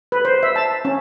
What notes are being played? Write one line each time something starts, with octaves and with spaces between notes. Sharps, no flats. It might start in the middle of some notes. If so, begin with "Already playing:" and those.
B4
C5
E5
A5
C#4